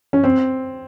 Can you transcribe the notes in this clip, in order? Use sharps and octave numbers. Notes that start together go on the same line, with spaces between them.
C#4
C4